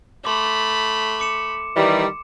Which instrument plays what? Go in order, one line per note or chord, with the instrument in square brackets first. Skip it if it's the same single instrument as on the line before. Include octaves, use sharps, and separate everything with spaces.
[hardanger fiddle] A3 B5 [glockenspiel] C6 D6
[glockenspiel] D6 C#7 E7
[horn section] D#3 E3 G3